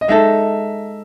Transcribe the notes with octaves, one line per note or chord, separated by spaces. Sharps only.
D#5
G#3 D#4 A4 E5